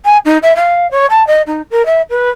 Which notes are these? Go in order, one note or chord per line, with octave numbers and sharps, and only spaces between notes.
G#5
D#4
E5
F5
C#5
A5
D#5
D#4
A#4
E5
B4